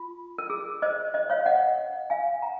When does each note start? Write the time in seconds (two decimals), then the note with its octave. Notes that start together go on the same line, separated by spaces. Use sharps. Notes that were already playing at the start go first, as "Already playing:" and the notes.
Already playing: F4
0.38 A#4
0.50 G#4
0.82 C5 D#5
1.14 C5 D#5
1.30 C#5 F5
1.46 D#5 F#5
2.10 F5 G#5
2.42 F#5 A#5